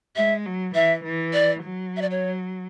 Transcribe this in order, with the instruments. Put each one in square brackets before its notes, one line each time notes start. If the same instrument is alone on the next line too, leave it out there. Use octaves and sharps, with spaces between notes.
[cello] G#3 [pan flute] E5
[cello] F#3
[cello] E3 [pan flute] E5
[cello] E3
[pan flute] D5
[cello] F#3
[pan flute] E5
D5
C#5